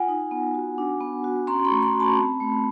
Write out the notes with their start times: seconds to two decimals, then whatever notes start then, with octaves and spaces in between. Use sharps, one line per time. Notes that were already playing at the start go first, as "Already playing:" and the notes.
Already playing: F4 F#5 G#5
0.08 D#4
0.31 B3
0.55 F#4
0.78 D4
1.01 B3
1.24 F#4
1.47 C#4 A#5 C6
1.65 B5 C#6
1.71 A3
1.82 A#5 C6
1.94 F#4
2.00 A5 B5
2.18 C4
2.40 A3